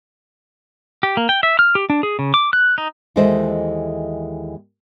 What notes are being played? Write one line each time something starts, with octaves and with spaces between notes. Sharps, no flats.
G4
A#3
G5
E5
F6
G4
D4
G#4
C#3
D6
F#6
D#4
D#2 E3 G#3 A4 C5 D#5